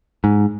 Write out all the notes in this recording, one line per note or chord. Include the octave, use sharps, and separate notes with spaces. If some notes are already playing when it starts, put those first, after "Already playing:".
G#2